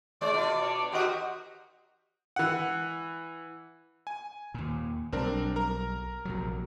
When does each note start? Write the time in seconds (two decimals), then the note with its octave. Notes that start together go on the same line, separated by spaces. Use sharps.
0.21 G#3 C5 D5
0.33 B2 F4
0.62 D4 C#5 D5
0.92 C4 D#4 F#4 G4 A#4 D#5
2.36 E3 F#5
4.07 G#5
4.54 D#2 A#2
5.12 B1 G3 C4 D4 A#4
5.56 A#4 A#5
6.25 A#1 C3 F#3